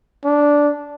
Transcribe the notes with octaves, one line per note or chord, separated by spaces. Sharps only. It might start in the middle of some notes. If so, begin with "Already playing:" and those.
D4